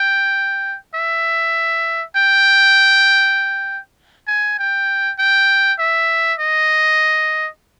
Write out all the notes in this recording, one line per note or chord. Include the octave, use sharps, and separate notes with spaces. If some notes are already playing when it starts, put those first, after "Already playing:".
Already playing: G5
E5
G5
G#5
G5
G5
E5
D#5